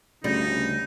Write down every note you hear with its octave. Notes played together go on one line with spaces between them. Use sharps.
D2 C#3 G3 D#4